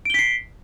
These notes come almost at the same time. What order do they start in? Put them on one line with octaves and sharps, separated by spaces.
D7 G7 B6 C7